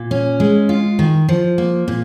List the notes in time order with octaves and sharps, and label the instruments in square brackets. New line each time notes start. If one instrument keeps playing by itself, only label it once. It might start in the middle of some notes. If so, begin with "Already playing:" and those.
Already playing: [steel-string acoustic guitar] A#2
C#4
G#3
F4
D#3
F3
A#3
A#2